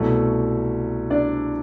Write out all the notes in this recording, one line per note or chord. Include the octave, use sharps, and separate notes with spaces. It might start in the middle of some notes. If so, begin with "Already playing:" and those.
Already playing: C2 B2 F#3 A3
D4 D5